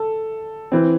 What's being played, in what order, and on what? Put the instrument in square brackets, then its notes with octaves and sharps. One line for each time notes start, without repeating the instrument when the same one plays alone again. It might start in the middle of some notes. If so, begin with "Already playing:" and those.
Already playing: [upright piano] A4
E3 C4